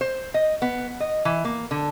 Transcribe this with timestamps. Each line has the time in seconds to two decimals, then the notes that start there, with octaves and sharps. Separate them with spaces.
0.01 C5
0.34 D#5
0.62 B3
1.00 D#5
1.25 E3
1.45 A#3
1.71 D3